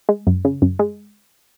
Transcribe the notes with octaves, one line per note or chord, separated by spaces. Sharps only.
G#3
F#2
C#3
F#2
G#3